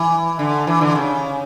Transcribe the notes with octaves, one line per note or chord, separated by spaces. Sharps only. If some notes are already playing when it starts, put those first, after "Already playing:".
Already playing: E3
D3
E3
D3
C#3